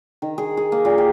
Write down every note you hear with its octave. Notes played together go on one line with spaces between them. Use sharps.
D#3
G#4
G#4
A#3
A#2
G4